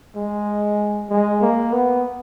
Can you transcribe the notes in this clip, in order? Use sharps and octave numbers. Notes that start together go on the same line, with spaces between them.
G#3
G#3
A#3
B3